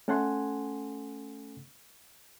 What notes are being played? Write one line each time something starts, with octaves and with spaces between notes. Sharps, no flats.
A3 C#4 A4 F#5 G#5 C6